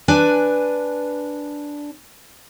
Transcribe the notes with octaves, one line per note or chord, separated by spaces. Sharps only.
D4 B4 G#5